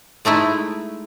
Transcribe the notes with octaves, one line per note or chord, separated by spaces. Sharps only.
G#3 A3 D#4 E4